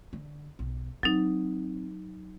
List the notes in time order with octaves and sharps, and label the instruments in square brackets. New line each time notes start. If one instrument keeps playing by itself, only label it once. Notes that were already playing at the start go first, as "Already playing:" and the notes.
[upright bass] D3
B1
[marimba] F#3 D#4 [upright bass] C4